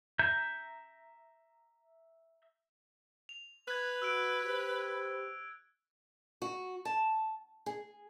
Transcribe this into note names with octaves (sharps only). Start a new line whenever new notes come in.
E5 A#5 G6
F7
B4 F#6 G#6
F#4 E6 F#6 D7
G4 C5
F#4
A5
G#4